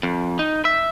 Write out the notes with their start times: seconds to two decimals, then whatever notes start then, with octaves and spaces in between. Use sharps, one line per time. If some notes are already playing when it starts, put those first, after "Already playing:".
0.03 F2
0.39 D#4
0.65 E5